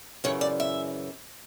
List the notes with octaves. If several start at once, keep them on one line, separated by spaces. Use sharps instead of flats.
F#2 C#3 E3 C#5
D5
E5